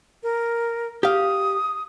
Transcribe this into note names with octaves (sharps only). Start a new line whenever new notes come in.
A#4
G4 F5 D#6